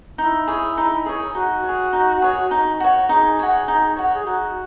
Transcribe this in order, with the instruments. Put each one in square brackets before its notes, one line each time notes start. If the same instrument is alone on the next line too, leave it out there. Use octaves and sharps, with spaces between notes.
[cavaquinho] D#4 [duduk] E4
[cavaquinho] G#4 C#5
D#4
G#4 C#5
[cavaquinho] D#4 [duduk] F#4
[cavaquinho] G#4 C#5
D#4
G#4 C#5
D#4
F#4 C#5
[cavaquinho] D#4 [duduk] G#4
[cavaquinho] F#4 C#5
D#4
F#4 C#5
[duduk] G#4
[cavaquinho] D#4 [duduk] F#4